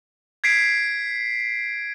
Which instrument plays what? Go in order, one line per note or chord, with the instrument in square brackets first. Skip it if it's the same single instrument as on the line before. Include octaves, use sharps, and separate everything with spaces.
[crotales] G#6 B6 C7 D7